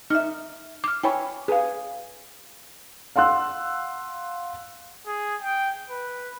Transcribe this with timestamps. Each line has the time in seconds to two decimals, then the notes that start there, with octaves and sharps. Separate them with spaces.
0.10 D#4 E5 F6
0.84 D6 F6
1.03 E4 C#5 G5 G#5 B5
1.48 G#4 B4 F5
3.16 F5 F#5 C6 E6 F#6
5.07 G#4
5.42 G5
5.90 B4